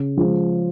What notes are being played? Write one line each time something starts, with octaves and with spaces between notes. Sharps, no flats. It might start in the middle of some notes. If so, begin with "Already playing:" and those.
Already playing: C#3
F3 G#3